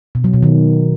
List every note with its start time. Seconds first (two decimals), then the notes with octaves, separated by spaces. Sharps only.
0.15 B2
0.24 F#3
0.33 B2
0.43 D#3